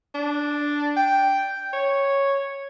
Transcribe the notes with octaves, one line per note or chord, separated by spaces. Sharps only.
D4
G5
C#5